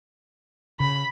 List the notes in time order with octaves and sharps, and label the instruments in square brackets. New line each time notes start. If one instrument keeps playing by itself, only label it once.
[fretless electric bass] C#3 [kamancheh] B5